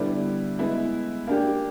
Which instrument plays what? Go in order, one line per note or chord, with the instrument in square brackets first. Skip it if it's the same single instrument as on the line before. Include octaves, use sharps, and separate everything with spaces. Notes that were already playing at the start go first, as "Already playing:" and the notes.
Already playing: [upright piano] D3 G3 B3 E4
G#3 B3 E4
A#3 D4 G4